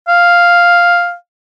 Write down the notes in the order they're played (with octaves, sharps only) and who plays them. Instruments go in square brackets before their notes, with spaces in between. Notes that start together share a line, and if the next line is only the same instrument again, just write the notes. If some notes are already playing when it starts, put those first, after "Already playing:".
[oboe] F5